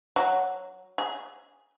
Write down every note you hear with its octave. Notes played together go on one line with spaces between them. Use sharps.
F#3
G#4